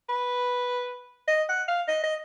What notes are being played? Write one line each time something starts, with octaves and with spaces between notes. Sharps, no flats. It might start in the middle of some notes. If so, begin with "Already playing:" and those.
B4
D#5
F#5
F5
D#5
D#5